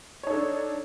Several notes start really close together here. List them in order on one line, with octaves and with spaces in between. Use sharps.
C#5 D#4 A4 D4